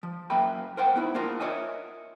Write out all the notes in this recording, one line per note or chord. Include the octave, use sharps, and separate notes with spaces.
F3
F#2 A#3 E5 G5 B5
A#4 C5 F#5 G5
B3 D#4 E4
A#3 D4 F4 A#4
A#4 C#5 D#5 E5 G#5